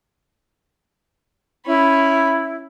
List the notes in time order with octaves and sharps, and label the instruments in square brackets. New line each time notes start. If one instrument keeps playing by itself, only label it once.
[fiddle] C#4 B5 [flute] E4